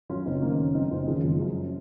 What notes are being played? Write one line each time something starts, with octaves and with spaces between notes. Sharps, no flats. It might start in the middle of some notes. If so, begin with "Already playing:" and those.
F#2 C#4 F4
F#1 C4 D#4
D#3 A#3 C#4
F#1
F#2 C4 D#4
D#4
F#1 C#4 F4
D#3 F3 G#3
F#1 F3
F#2